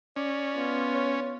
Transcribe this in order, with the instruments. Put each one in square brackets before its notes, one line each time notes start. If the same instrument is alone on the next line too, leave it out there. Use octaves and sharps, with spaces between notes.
[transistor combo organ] C#4 [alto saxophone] D5
[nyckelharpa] B3 F4
[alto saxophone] C#5